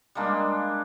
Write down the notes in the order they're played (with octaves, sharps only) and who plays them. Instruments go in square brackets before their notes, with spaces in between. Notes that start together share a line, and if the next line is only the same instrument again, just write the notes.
[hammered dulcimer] G3 G#3 A#3 D4